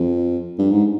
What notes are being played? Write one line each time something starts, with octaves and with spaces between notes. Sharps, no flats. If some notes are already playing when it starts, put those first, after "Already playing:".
Already playing: F2
G2
G#2